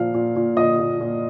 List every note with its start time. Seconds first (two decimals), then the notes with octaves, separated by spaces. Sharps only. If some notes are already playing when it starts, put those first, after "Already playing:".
Already playing: A#2 F3 F5
0.14 A#2
0.36 A#2
0.57 A#2 D#5
0.79 A#2
1.01 A#2